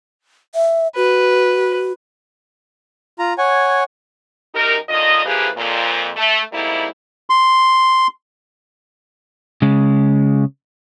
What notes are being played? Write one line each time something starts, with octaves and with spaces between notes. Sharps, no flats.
E5
F#4 B4
F4 A#5
C#5 F#5 G#5
F#2 D#4 G4 A#4
D3 D#3 F4 D#5
E3 F3 A#3 G4 G#4 B4
F2 A#2
A3
F2 G#2 G3 A#3 E4
C6
C#3 G#3